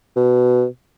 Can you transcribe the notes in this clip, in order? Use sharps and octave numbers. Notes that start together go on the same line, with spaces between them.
B2